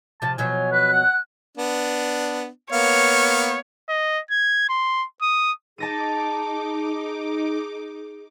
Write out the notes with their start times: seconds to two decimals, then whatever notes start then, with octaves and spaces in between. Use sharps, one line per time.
0.22 C3 F3 A5
0.38 B2 F3 F#3 G#5
0.72 B4 F#6
0.93 F#5
1.57 B3 D4
2.72 A#3 B3 C#5 F5
3.89 D#5
4.31 G#6
4.69 C6
5.22 D#6
5.78 D#4 G#4 A5 D6 A#6 D#7